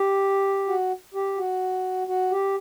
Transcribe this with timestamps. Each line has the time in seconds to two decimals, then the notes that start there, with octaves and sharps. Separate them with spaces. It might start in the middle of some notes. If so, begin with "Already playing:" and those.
Already playing: G4
0.68 F#4
1.14 G4
1.37 F#4
2.07 F#4
2.31 G4